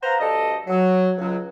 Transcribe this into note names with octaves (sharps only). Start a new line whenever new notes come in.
B4 C5 F5 F#5 A#5
D2 G2 A4 D5 D#5
F#3
C#2 F#3